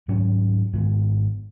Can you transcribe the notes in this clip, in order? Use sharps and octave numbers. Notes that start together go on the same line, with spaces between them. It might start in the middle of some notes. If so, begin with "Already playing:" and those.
G#2 D#3 F#3 C#4
G#2 D#3 G#3 B3